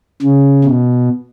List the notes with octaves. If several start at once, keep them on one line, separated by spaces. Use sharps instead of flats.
C#3
B2